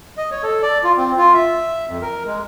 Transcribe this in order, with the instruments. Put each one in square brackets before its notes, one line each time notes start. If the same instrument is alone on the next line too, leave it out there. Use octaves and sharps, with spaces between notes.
[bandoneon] D#5
C#5
A4
D5
F4
C4
F4
E5
F2
A#4
G#3